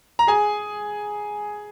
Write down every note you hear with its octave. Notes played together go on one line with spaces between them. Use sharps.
A#5
G#4 G#5